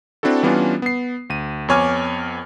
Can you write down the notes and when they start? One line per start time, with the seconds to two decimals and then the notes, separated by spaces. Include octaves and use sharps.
0.23 C4 D4 E4 F#4 A4
0.43 E3 G3 B3 C#4 D4 F4
0.82 B3 C7
1.30 D2 D#7
1.68 F2 B3 C#5 G#5 D6 F6